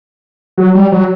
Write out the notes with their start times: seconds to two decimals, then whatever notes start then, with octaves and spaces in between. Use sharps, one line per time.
0.58 F#3
0.75 G3
0.92 F#3